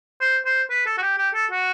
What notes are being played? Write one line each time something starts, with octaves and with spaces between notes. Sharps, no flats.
C5
C5
B4
A4
F#4
G4
G4
A4
F#4